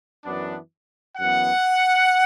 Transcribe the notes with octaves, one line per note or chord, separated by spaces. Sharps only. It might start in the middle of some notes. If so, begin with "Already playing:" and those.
F#2 E3 B3 D4
F#2 E3 B3 F#5